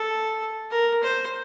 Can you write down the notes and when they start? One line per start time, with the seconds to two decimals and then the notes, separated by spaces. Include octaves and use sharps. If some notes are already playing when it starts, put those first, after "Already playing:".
Already playing: A4
0.71 A#4
1.03 C5